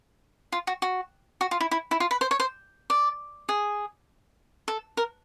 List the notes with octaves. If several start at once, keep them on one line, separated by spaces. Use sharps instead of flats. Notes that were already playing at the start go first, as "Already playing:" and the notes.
F4
F#4
F#4
F#4
F4
E4
E4
E4
F4
B4
C5
C#5
C5
D5
G#4
A4
A#4